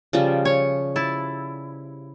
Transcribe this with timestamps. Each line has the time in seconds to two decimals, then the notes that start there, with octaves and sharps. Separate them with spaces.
0.13 C#3 F3 G3
0.45 C#5
0.96 E4 A5